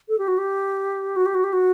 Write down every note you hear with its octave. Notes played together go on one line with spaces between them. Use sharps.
A4
G4
F#4
G4
F#4
G4
F#4
G4
F#4